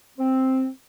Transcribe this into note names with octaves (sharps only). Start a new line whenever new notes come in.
C4